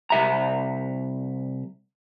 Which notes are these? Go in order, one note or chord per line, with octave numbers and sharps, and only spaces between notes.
C2 E5 A#5